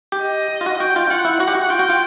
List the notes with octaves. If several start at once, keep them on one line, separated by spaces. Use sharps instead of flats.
G4
D#5
F4
F#4
F#4 G5
F4
F4 F#5
E4
F#4 F#5
G4
F#4
F4 G5
F#4
F4